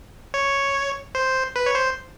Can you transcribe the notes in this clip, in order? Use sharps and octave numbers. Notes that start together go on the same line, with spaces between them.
C#5
C5
B4
C#5
C5